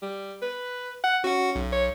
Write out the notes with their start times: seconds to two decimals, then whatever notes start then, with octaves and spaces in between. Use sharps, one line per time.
0.02 G3
0.42 B4
1.04 F#5
1.24 C#4 F#4 F#5
1.55 B1
1.72 C#5